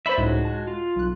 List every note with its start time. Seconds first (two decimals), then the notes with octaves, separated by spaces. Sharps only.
0.06 C5 D5 E5 B5 C6
0.18 C#2 A2 G#3 D#4 F#4
0.45 A5
0.67 F4
0.96 B1 F#6